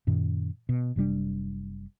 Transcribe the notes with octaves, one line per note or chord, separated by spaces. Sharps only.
F#2 A#2 D#3
B2
F#1 C3 G3 D4